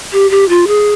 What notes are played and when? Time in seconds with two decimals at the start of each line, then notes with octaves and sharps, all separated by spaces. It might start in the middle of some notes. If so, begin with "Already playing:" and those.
0.13 G4
0.31 G4
0.49 F4
0.68 G#4